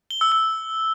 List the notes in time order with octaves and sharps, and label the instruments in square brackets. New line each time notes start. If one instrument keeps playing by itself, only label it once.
[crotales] G7
E6
E6